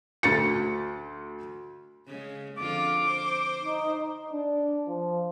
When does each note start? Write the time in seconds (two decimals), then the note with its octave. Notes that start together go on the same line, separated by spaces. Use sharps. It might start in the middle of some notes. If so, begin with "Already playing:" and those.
0.23 D2 A6 C#7
2.08 C#3 G#3
2.57 F2 D3 F4 D6
3.04 C5
3.62 D#4
4.33 D4
4.87 F3